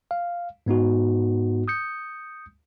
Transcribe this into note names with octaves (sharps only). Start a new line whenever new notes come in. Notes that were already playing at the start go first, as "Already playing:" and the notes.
F5
G#2 B3 D#4 F#4
D#6 G6 C#7